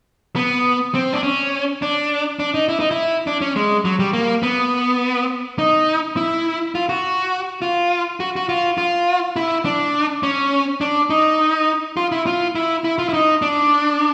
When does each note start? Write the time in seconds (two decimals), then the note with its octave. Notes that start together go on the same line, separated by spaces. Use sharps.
0.36 B3
0.94 C4
1.13 D4
1.23 C#4
1.82 D4
2.39 D4
2.54 D#4
2.69 E4
2.80 D#4
2.91 E4
3.27 D4
3.41 C#4
3.56 G#3
3.85 F#3
3.99 G3
4.13 A#3
4.43 B3
5.58 D#4
6.17 E4
6.75 F4
6.89 F#4
7.62 F4
8.20 F#4
8.36 F#4
8.49 F4
8.78 F4
9.36 E4
9.65 D4
10.23 C#4
10.81 D4
11.10 D#4
11.97 F4
12.12 E4
12.27 F4
12.55 E4
12.84 E4
12.98 F4
13.09 E4
13.14 D#4
13.42 D4